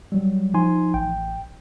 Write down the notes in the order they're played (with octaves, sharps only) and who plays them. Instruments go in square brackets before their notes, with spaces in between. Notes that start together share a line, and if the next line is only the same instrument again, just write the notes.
[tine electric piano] F#3 G3
F3 D#4 G#5 C6
A1 G5